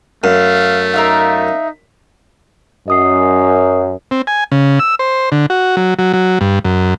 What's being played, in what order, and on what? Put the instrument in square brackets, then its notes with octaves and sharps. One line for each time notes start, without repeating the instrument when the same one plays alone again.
[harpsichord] F#2 [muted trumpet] A3 [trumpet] F5
[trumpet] D#4 [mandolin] A#4 E5 F5
[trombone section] F#2 [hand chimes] D#5 D#6 C7
[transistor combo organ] C4
G#5
C#3
E6
C5
D3
F#4
F#3
F#3
F#3
G2
F#2